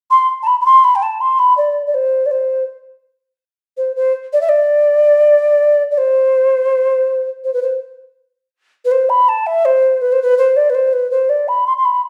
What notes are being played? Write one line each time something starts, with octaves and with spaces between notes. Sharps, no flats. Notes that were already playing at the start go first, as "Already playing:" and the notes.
C6
A5
B5
B5
C6
B5
G5
A5
C6
B5
D5
D5
C5
D5
C5
C5
C5
D5
E5
D5
D5
C5
C5
B4
C5
B4
C5
B5
A5
E5
C5
B4
C5
B4
C5
D5
B4
C5
B4
C5
D5
B5
C6
C6
B5